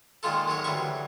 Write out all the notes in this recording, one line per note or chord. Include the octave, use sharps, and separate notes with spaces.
A#2 D#3 G#3 F4 A4
D#3 F#3 G#3 C#5
D2 E3 F#3 G3 C#6